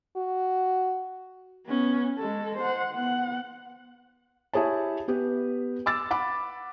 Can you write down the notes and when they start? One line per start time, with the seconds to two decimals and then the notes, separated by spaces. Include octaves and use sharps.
0.16 F#4
1.67 B3 C#4
2.18 G#3 A4
2.57 C5 F#5
2.94 B3 F#5
4.54 E4 G4 G#4 C#5 A5
5.08 B3 G4 B4
5.86 D6 E6 A6
6.11 F#5 B5 D6